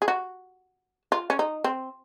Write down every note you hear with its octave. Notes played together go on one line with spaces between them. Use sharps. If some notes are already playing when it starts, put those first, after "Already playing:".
G#4
F#4
F4
C#4
D#4
C4